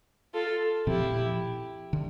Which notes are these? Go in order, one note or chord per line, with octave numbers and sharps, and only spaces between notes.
F4 A4
A#2 F3 C4 E4 G4
D3